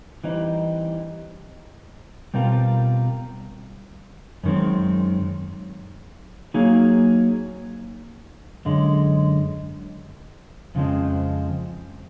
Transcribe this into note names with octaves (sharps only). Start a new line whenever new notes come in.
E3 G3 C4 D#4
B2 G3 C4 F4 A#4
F#2 D#3 G#3 C4
F#3 A#3 D#4 G#4
F#2 D3 G#3
F2 C#3 F3 G#3 C4